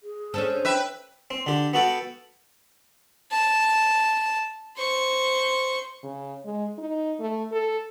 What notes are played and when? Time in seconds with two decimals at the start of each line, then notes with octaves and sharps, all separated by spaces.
0.03 G#4
0.34 C#4 D4 A4 C5
0.65 B4 E5 G5
1.31 C4
1.46 D3 G4
1.74 B3 F#4 A4 G5
3.31 A5
4.77 C5 C#6
6.04 C#3
6.44 G#3
6.78 D#4
7.20 A3
7.52 A4